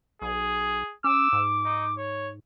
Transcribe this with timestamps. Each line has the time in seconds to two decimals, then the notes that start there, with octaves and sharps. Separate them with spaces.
0.22 B1 G#4
1.04 C#4 D6 E6
1.33 G#2
1.65 D#4
1.98 C#5